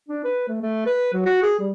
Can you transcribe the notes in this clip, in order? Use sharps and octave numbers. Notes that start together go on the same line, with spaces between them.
D4
B4
A3
A3
B4
F#3
F#4
G#4
G3